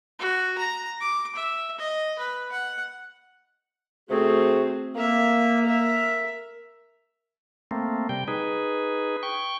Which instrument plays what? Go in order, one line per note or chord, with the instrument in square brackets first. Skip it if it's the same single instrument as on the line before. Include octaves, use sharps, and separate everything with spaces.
[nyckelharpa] F#4
A#5
D6
E5
D#5
B4
F#5
[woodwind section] C3 F#4 G#4 [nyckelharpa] A3 C4
[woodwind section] A#3 [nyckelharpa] A#4 E5
[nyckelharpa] A#4 E5
[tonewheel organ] A3 A#3 C4
C3 G3 G5
D#4 G#4 B4
G5 C#6